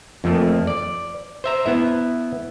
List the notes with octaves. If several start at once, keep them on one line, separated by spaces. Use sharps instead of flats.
F2 F3 A3 A#3
D5
C5 E5 A#5
B3 E4 E5